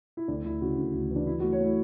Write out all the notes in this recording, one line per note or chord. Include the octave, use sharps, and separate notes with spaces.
E4
D2 D4
D2 E4
C#3 F#4
D2
D2
E3
D4
F#3 E4
F#4
A3
C#5
A3 E4